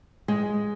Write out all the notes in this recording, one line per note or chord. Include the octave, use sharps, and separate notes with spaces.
G#3